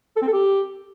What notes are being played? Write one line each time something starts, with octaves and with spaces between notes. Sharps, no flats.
A4
C4
A4
G4